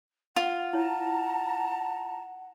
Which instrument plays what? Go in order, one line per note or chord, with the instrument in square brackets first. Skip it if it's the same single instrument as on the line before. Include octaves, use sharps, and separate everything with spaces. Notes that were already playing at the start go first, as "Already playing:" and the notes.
[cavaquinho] F4 [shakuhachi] F#5
[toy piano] E4 C#5 [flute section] A5 A#5